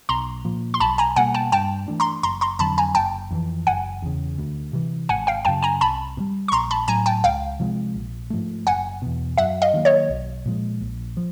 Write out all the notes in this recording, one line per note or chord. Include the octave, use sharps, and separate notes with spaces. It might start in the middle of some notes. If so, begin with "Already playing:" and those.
B1 A#5 C6
A#2 F3 A#3
C6
B1 A5 B5
G#5 A#5
B2 G3 A#3 F#5 G#5
G5 A5
G2 G5 A5
E3 A3 D4
A#5 C6
F#1 A#5 C6
A#5 C6
F2 D3 F#3 A5 B5
G#5 A#5
F#1 G5 A5
F2 C3 E3
F#1 F#5 G#5
E2 C#3
D2
C3 E3
G#1 F#5 G#5
F5 G5
F#2 C#3 G5 A5
G#5 A#5
C2 A5 B5
B2
G3
C#6
A#1 A#5 C6
A5 B5
A2 F#3 G#5 A#5
G5 A5
C#2 F5 G5
C3 F3 G#3
A#1
G#2 F3 A3
F#1 F#5 G#5
E2 B2
F#2 E5 F#5
D#5 F5
D#3 F#3 A#3
C#5 D#5
B1
A#2 F3 G#3
A#1
F3